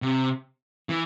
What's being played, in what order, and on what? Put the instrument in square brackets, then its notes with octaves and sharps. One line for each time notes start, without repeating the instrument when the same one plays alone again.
[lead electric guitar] C3
E3